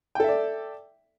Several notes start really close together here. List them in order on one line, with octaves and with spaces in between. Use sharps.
G5 A4 E5 D5